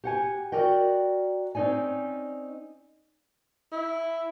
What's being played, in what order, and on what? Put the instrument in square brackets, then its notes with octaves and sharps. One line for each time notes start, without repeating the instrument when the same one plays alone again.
[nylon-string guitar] G4 F#5 G#5
F#4 A#4 D5 D#5 G5
C4 C#4 D#4 D5 G#5
[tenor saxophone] E4